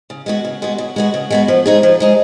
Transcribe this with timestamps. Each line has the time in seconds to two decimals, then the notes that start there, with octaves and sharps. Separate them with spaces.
0.10 C#3
0.26 G#3 B3 F#4
0.45 C#3
0.62 G#3 B3 F#4
0.78 C#3
0.96 G#3 B3 F#4
1.14 C#3
1.30 G#3 B3 F#4
1.48 F3
1.66 G#3 D#4 G#4
1.83 F3
2.00 G#3 D#4 G#4